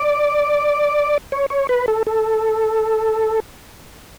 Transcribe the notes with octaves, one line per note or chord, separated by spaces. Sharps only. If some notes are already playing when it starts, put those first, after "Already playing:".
Already playing: D5
C#5
C#5
B4
A4
A4